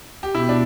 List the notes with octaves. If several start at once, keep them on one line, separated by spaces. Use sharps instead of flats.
G4
B2 E4
D4